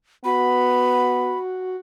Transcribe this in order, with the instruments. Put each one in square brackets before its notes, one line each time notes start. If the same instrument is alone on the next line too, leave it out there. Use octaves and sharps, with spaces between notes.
[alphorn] B3 [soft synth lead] F#4 [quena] B5